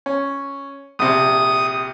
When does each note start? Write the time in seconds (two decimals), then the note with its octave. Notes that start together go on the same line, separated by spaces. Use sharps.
0.06 C#4
0.99 A#1 C3 D#6